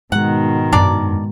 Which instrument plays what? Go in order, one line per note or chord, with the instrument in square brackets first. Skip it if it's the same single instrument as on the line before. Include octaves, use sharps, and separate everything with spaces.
[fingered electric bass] G#2 G#3 [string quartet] B2 D#3 [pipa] F#5
[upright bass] F#2 E4 [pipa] D4 A#4 D5